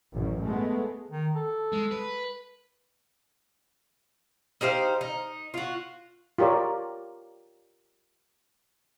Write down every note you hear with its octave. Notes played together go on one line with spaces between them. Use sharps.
A1 F#2
G#3 A3 B3
D#3
A4
G#3
B4
D#4 G4 C5 F5
D#4
F4 F#4
F4 G4 A#4 C#5 D5